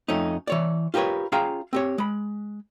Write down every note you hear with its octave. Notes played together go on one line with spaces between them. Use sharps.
F2 A3 C#4 D#4
E3 C#5 D5
F4 G4 A#4 B4 C#5
C#4 F4 G#4 F5 G5 A#5
C4 G4 C#5
G#3 B5